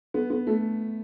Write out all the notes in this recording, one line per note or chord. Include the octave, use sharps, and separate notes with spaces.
B3
B3
A3